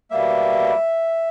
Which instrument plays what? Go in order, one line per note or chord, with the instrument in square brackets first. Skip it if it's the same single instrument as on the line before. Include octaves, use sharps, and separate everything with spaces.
[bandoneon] B2 G3 A#3 E5